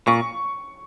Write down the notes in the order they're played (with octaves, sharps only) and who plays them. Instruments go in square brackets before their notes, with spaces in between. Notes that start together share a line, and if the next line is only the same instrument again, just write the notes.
[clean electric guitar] A#2 [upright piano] C#6